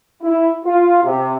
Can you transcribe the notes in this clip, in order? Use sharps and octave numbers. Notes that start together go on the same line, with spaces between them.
E4
F4
C3